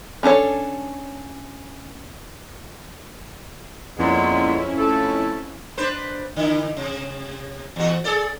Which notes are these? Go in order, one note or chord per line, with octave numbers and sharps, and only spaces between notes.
C#4 D4 A4 C#5
F2 A#2 G#3 B3 C#4 E4
A3 A4
D4 B4 C5
D3 E4
C3
E2 F#4
G#4 A4 D5